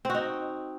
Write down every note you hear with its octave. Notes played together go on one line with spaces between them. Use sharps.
C4 D#4 F#4